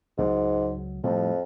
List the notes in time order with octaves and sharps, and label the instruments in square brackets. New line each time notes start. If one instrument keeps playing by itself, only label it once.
[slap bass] C#2 F#3 [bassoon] G#2
[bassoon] F2 [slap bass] A2 F3 G3